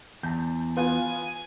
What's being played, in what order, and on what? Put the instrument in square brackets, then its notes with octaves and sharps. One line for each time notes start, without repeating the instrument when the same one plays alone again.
[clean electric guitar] E2 [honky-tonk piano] A5 G6
[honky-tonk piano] B3 F4 F#6 [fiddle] G#5